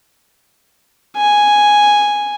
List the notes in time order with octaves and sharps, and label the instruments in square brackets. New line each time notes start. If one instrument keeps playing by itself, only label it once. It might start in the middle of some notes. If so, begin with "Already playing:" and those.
[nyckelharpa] G#5